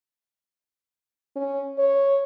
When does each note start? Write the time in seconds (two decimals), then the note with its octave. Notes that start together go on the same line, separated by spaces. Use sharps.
1.36 C#4
1.78 C#5